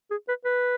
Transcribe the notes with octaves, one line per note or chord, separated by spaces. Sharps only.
G#4
B4
B4